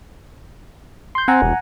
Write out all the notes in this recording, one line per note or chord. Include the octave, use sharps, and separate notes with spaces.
C6 G6
C4 F#5 G#5 A#5
E1